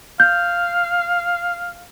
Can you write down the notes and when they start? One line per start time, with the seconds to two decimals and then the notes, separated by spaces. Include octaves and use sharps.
0.20 F5 G6